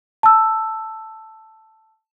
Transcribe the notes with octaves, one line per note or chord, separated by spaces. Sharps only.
A5 E6